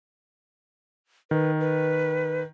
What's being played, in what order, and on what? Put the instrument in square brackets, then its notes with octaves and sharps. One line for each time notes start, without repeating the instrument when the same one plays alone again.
[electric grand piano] D#3 [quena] B4
[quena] B4